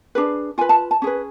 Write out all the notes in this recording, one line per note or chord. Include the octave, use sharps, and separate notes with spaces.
D4 G#4 B4
F4 B4 G#5
A5
A5
C#4 G#4 B4